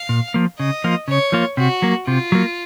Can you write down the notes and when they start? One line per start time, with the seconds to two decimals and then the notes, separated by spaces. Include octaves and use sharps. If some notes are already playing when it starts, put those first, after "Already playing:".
Already playing: F5
0.09 A#2
0.34 F3 A#3
0.59 C#3 D#5
0.84 F3 A#3 F4
1.08 C#3 C#5
1.32 F3 A#3 F4
1.57 C3 F#4
1.82 F#3 A#3
2.07 C3 F4
2.32 F#3 A#3